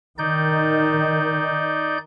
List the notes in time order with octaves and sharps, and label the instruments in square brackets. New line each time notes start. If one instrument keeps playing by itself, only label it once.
[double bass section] D#3 [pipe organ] D#4 D5 G6